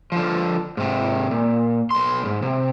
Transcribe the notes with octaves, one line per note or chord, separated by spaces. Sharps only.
D3 F3
G#2 C3
A#2
B1 C6
G#2
C3